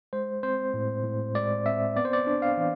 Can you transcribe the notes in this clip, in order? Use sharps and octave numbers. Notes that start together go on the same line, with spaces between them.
G#3 C5
C4 C5
A2
A2
G#3 D5
C4 E5
B3 D5
C5
D5
D4
F5
E3